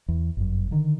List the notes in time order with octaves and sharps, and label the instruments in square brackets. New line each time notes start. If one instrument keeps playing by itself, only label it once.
[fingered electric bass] E2
G1 F#2
D3 D#3